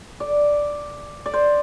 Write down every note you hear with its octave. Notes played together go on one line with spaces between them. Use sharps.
D5
D5
C5